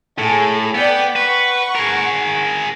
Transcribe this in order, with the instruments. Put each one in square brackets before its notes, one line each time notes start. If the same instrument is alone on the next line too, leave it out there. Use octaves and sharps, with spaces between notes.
[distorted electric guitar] A2 [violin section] G#4 A4
[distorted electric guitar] B3 [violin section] D5 G5
[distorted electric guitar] B4 [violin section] F#5 C#6
[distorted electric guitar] G#4 A#4